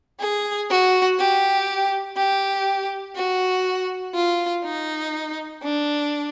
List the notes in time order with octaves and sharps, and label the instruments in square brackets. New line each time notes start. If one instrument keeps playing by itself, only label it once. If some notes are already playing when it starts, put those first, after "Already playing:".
[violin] G#4
F#4
G4
G4
F#4
F4
D#4
D4